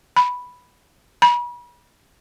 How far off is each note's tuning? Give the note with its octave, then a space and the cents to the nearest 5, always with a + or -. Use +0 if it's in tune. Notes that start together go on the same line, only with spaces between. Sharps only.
B5 +0
B5 -40